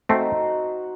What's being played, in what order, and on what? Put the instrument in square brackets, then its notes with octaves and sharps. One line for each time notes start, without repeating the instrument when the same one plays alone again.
[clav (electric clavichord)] A3 C4 [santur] D#4 F#4 C5